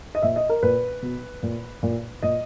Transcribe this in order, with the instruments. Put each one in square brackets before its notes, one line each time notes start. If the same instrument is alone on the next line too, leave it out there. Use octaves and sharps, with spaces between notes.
[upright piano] D#5
A#2 E5
D#5
A#4
A#2 B4
B2
A#2
A#2
A#2 D#5